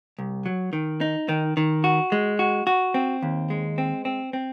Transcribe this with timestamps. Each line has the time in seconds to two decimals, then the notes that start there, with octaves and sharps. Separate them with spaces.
0.19 C2
0.46 F#3
0.73 D#3
1.01 D#4
1.29 D#3
1.57 D#3
1.84 F#4
2.12 G#3
2.39 F#4
2.67 F#4
2.94 C4
3.23 D#2
3.50 G#3
3.78 C4
4.05 C4
4.33 C4